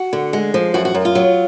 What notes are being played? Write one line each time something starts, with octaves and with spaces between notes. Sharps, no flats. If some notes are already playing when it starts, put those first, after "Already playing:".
Already playing: F#4
D3
G#3
F3
F#2 F#4
F#4
F#2
F4
F#3